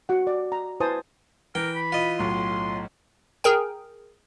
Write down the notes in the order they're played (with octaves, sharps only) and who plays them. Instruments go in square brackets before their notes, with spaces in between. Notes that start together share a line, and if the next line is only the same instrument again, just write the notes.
[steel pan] F#4 F#5
D5
A#5
E4 B4 C5 G#5 A5 D#6
[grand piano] E3 [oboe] A#4 [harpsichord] G5
[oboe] B5
[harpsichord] F4 D#5
[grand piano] B1 A2 [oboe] C6
[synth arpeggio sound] G#4 A#4 G5